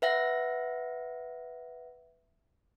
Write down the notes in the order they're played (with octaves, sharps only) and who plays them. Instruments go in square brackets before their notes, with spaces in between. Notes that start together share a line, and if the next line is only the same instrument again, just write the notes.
[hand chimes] B4 E5 F#5 A#6